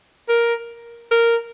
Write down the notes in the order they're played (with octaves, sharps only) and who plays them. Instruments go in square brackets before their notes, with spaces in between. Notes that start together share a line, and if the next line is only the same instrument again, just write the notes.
[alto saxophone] A#4
A#4